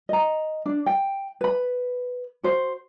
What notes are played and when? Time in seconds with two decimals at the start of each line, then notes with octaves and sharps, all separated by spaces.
0.09 D#5 A#5
0.66 D4
0.86 G5
1.41 B4 B5
2.43 F#4 C5